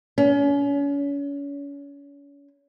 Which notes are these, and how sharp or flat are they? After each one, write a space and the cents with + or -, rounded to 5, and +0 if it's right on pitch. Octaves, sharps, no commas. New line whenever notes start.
C#4 +35